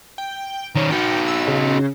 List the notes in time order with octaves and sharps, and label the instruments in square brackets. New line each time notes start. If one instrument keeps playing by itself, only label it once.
[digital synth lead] G5
[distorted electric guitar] D#3 C#4
[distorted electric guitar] D#4 F#4 [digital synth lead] G5
[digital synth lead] E6
C#3